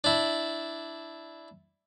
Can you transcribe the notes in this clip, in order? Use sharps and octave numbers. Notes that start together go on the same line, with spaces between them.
D4 E4